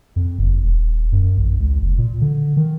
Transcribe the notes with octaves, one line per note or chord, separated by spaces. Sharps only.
F2
F#1
D#1
F#2
A1
C#2
F#1
A#2
D3
D#3